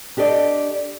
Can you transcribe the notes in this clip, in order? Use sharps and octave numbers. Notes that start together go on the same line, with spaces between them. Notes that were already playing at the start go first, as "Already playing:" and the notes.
D4 G4 A4 D5 D#5